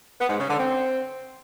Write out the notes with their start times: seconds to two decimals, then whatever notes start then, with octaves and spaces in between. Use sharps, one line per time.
0.19 B3
0.29 G#2
0.39 C#3
0.49 D3
0.59 C4